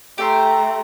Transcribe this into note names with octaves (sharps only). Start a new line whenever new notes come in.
A3 G4 E5 A#5 C6